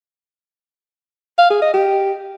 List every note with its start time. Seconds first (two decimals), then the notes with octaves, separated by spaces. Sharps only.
1.38 F5
1.50 G#4
1.62 D#5
1.74 G4